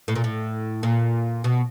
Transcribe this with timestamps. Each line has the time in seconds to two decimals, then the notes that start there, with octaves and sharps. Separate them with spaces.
0.08 A2
0.16 A#2
0.24 A2
0.83 A#2
1.44 B2